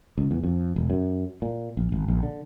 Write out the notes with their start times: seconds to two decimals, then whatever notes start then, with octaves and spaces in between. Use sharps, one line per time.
0.18 C#2
0.31 E2
0.43 F2
0.76 E1
0.90 F#2
1.42 A#2
1.77 A#1
1.92 G#1
2.08 A#1
2.23 D3